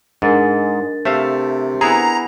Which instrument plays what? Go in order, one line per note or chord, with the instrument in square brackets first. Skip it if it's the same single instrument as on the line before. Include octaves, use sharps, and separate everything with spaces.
[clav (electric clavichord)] G#2 [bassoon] G#3 [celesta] D4 A#4 A6
[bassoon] C3 [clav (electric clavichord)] A3 E5 F5
[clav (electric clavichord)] B3 E4 G#4 [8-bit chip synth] A#5